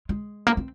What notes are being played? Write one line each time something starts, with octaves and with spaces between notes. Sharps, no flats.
G#3
A#3
C4